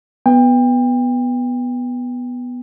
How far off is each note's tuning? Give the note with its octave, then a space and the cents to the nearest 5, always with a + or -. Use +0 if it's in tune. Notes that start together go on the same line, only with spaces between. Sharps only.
B3 +0 G5 +30